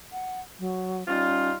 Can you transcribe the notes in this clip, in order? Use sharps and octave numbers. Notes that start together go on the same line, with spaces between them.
F#5
F#3
G3 C#4 D#4 F4